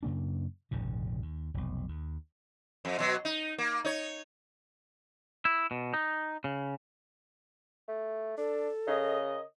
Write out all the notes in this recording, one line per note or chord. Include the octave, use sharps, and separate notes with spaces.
F#2 C#3 A#3 D4
F1 A#1 G#2 C#3
D#2
F1 B1
D#2
F2
B2 F#3
D#4
A#3
D#4 C#5
E4
B2
D#4
C#3
A3
D4 A4
C#3 A#4 C#5 D#5